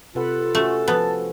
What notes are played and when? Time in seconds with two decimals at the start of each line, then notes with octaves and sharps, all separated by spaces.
0.15 C3 F4 A4 B4 F#5
0.55 A3 C#4 F#4
0.88 F3 B3 A5